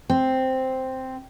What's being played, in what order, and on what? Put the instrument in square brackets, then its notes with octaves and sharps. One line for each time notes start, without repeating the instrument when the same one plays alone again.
[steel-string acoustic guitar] C4